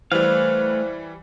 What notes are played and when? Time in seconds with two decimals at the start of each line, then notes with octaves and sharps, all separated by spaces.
0.12 E3 G3 A3 B4 C5 F5